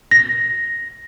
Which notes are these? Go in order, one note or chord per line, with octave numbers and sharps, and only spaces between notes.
A#6